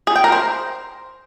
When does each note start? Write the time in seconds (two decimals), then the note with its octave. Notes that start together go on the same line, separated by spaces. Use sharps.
0.07 G#4
0.16 G5
0.24 A#4
0.32 C5